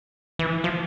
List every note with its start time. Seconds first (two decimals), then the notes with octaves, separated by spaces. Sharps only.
0.39 E3
0.64 F3